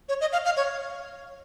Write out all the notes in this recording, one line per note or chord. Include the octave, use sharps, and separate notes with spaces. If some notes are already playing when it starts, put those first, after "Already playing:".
C#5
D#5
F5
F5
C#5